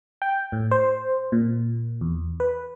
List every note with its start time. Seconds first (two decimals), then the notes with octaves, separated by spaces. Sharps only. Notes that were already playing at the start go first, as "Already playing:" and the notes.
0.22 G5
0.52 A2
0.71 C5
1.32 A#2
2.01 E2
2.40 B4